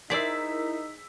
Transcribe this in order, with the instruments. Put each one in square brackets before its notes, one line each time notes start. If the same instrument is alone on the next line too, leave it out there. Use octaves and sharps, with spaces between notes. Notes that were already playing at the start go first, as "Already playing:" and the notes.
[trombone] D#4 [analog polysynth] E4 A#4 [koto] G#4 C5 D5 [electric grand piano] E6 B6